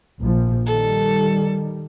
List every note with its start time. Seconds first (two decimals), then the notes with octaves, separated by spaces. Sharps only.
0.20 A#1 F3
0.66 D#3 G3 A4